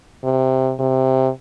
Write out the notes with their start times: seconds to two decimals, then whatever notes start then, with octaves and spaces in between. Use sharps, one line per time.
0.24 C3
0.79 C3